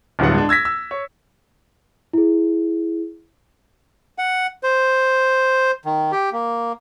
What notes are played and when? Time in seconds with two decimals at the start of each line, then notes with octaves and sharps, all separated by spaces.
0.19 D1 D2 G2 F#3 B3 F#5
0.35 G#3 D4
0.49 E6 G#6 A#6 B6
0.65 E6
0.91 C#5
2.13 E4 G#4
4.18 F#5
4.63 C5
5.85 D#3
6.12 G4
6.33 A#3